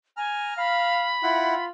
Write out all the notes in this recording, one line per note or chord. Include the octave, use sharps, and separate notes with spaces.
G#5 A#5 F6
F5 B5
E4 F4 F#5